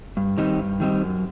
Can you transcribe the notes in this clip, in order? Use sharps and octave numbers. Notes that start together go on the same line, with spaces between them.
G2
D#3 G3 C4 D#4
G2
D#3 G3 C4 D#4
F#2